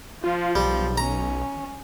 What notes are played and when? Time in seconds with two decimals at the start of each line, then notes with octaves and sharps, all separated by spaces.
0.24 F3 F4
0.55 B1 G3
0.98 C#4 A#5